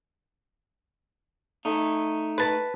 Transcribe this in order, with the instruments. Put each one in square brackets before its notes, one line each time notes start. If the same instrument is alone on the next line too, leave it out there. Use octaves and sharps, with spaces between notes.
[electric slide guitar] A3 D#4
[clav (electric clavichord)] B4 A5